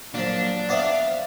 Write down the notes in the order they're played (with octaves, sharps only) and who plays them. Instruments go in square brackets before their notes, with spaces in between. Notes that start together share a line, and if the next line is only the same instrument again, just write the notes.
[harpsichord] A#2 F3 [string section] F#3 [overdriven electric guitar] D4
[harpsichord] B3 C5 D5 [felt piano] E5 D#6 A6 [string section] F5